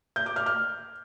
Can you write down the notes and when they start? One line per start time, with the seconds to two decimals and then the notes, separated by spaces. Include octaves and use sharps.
0.16 G6
0.26 D6
0.36 F6
0.46 F6